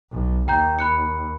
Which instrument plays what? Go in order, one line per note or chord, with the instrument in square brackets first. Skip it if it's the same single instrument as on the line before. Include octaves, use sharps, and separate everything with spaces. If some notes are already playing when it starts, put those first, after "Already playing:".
[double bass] B1
[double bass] D#2 [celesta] G5 A#5 G6
[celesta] B5 F#6 C#7